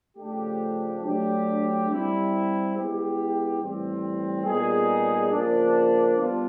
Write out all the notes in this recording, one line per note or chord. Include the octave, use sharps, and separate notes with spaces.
C#3 F3 A3 D4 G4
F#3 A3 D4 G4
G3 C4 E4
G#3 B3 E4 G4
A2 E3 G3 C4
A#2 G3 B3 D#4 G#4
C#3 F3 A#3 D4
G3 B3 D4 F4